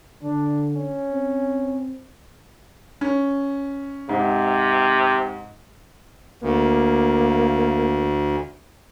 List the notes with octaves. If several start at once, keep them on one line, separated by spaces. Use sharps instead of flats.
D3 D4
C#4
C4
C#4
G#2 C3
D2 A#3